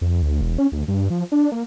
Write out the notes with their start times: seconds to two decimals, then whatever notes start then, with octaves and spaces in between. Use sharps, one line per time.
0.01 F2
0.22 D2
0.41 E1
0.58 C#4
0.72 D2
0.88 G2
1.10 F3
1.32 D4
1.52 A#3